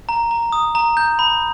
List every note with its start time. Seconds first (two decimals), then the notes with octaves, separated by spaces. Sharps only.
0.09 A#5
0.31 A#5
0.52 D#6
0.75 A#5
0.97 G6
1.19 B5